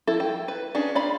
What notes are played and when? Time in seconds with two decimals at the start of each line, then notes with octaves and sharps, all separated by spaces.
0.07 F3 E4 A4
0.20 G5
0.48 B4
0.75 C#4 D4 G#4
0.95 F4 D5 B5